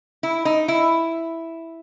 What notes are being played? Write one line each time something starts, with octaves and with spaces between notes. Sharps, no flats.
E4
D#4
E4